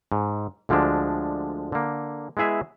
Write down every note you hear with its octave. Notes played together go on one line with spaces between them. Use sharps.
G#2
D2 D3 F3 G#3 D4
D3 A#3
G#3 B3 E4 G#4 E5